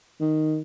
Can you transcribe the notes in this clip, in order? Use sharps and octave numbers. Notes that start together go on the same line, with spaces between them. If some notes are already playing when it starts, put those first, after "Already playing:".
D#3